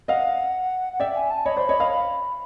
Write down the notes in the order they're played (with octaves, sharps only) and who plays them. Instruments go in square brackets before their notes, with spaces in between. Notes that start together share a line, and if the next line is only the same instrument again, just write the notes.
[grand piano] D#5 F5 [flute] F#5
[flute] F#5
[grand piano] D5 E5 [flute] G5
[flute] G#5
A5
[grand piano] C#5 D#5 [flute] B5
[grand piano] C5 D5
C#5 D#5
D#5 F5
[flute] B5